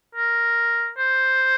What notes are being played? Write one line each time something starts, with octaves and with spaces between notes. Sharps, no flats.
A#4
C5